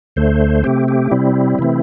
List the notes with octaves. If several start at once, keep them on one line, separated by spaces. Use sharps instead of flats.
D2 D3 A3 C5
C3 A3 C4 G4
G4
C3 G3 C4 E4
C3 E3 A3 C4